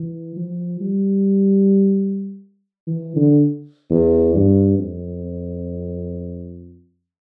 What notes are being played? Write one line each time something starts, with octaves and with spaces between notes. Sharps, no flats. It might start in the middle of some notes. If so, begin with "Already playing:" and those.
Already playing: E3
F3
G3
E3
D3
E2
G2
F2